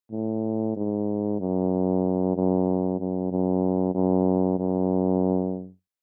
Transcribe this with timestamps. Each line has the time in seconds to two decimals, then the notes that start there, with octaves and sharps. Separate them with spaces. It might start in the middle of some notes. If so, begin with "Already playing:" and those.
0.12 A2
0.76 G#2
1.40 F#2
2.36 F#2
2.99 F#2
3.32 F#2
3.95 F#2
4.59 F#2